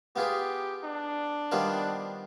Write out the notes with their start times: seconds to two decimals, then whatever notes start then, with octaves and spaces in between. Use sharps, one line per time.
0.16 B3 F4 G4 G#4 B4
0.84 D4
1.52 D#3 G3 B3 F4 C5